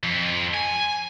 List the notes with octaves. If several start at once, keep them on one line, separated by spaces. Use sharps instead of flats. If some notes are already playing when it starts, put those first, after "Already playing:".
F2
G#5